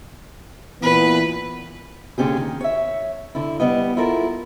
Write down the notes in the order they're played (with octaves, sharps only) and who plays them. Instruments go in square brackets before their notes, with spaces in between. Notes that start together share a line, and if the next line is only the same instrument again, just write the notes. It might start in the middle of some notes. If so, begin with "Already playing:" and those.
[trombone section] A#2 E3 B3 [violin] B4
[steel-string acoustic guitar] A#2 D3 C#4 G4 G#4
D#3
C#5 E5
D3 E4
G3 B3 D#5
E4 F4 A4 A#4